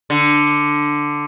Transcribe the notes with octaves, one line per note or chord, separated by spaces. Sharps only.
D3